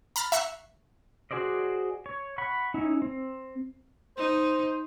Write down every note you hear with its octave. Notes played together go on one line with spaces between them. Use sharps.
A#5 B5 F6 A6
E5 A#5 C#6 F#6 C7
F#4 G#4 C5 D5 D#5
C#5
F#5 B5 C#6
C#4 D#4 E4
C4
D#4 C5